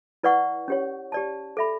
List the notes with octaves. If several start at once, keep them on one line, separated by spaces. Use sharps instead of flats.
E4 B4 D5 F#5 C#6
C#4 G4 C#5
G4 D5 A5
A4 E5 B5